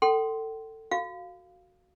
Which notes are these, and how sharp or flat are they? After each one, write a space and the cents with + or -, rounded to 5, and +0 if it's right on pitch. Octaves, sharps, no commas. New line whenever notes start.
A4 +20 G5 -40 C6 -5
F#4 +0 F5 +0